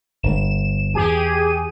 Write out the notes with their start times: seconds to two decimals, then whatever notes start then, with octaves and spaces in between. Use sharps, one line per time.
0.23 G1 E7
0.94 E2 G4 G#4 D#7